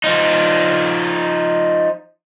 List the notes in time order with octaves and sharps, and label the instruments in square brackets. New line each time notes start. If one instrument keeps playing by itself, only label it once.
[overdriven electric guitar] F3 D#4